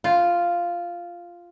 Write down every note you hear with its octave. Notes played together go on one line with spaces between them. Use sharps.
F4